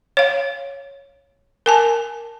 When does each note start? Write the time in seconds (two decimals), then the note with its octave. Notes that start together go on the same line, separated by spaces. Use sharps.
0.17 C#5 F5
1.66 A#4 G#5 A5